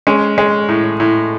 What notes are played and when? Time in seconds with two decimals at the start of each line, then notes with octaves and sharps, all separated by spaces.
0.07 G#3 C#4
0.38 G#3
0.69 A2
1.00 A2